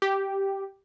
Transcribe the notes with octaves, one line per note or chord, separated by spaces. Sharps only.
G4